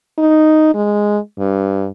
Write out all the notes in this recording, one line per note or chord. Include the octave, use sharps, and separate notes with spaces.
D#4
G#3
G2